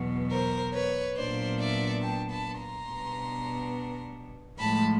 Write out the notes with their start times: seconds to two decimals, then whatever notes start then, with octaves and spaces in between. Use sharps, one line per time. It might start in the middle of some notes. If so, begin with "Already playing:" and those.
Already playing: E2 B2 F#3 B3
0.30 A#4 C5
0.73 B4 C#5
1.16 A#2 F#3 B3 D4 C5 D5
1.59 D5 E5
2.01 G5 A5
2.30 A5 B5
2.59 A#5 C6
2.87 B2 G3 B3 D4
4.58 A2 F3 G#3 A5 B5